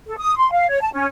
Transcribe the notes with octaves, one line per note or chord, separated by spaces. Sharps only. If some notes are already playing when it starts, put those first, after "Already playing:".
A4
D#6
C6
F5
C#5
A5
C#4